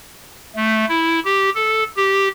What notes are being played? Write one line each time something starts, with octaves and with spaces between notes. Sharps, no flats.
A3
E4
G4
A4
G4